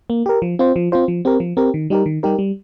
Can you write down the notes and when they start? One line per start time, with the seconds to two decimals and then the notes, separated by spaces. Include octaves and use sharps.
0.10 A#3
0.26 G4 A#4
0.42 F3
0.59 C4 F4 C5
0.76 F3
0.92 C4 F4 C5
1.08 F3
1.25 C4 G4 A#4
1.40 F3
1.57 C4 G4 A#4
1.74 D#3
1.90 G3 D#4 G4 A#4
2.06 D#3
2.23 G3 D#4 G4 A#4
2.39 G3